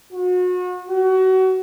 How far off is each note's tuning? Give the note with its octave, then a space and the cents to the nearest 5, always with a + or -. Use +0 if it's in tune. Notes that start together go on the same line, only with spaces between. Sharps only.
F#4 -35
F#4 +30